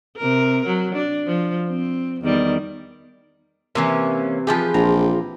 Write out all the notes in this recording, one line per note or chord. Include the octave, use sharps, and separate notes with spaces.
C3 A#4
F#3
D4
F3
C4
E2 D#3 G3
C3 E3 A#3 C#4
F3 F4 G4 G#4 B4
A#1 A#5